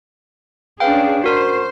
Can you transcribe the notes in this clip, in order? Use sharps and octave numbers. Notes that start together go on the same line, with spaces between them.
C#4 D4 G#4 B4 F5 G5
F#4 A#4 C5